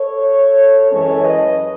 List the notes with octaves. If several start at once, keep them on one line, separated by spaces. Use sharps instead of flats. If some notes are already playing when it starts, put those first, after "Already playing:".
Already playing: A4 C#5
F#2 E3 G#3 C#4 A4 C#5
B4 D#5